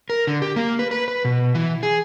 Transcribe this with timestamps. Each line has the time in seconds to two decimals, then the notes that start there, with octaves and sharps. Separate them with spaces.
0.10 A#4
0.27 D3
0.42 G4
0.56 A#3
0.79 B4
0.91 B4
1.08 B4
1.25 B2
1.55 E3
1.83 G#4